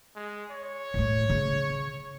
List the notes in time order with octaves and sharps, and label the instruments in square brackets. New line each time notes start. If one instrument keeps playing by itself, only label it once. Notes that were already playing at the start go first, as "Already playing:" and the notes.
[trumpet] G#3
C#5
[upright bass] A2 A3
C#3